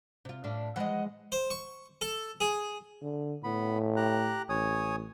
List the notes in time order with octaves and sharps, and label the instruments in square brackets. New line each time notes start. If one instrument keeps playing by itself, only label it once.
[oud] C3 F4
A2 D4 F5
[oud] E3 F3 G#3 [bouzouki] D#5 F#5
[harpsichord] C5
C#6
A4
G#4
[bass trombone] D3
[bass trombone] A2 [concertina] B3 B5
[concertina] G4 A#5 F#6
[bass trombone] A1 [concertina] C#5 G#5 D#6